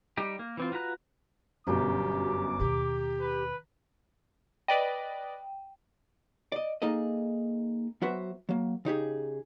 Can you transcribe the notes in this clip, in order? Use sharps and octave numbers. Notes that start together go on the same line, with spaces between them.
G3 D#4 G4
A#3
E3 C4 F4
F4 F#4 B4 A#5 F#6
G1 F#2 B2 G4 D6
D#2 B2 G4 A#5
B4
B4 D5 D#5 G5
D5 D#5
A#3 D#4 G#4 A4 D#5
F#3 B3 F#4 B4 C5 E5
F#3 A#3
C#3 D#4 G4 G#4